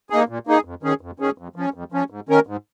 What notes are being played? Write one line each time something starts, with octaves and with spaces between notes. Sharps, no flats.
A#3 D#4 G#4
A#2
A#3 D#4 G#4
F2
D#3 C#4 G#4
F2
D#3 C#4 G#4
F2
F3 C#4
F2
F3 C#4
G#2
D#3 C#4 A#4
G#2